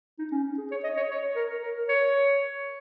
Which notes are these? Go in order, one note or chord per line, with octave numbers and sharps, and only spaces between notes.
D#4
C#4
G#4
C#5
D#5
C#5
C#5
A#4
A#4
C#5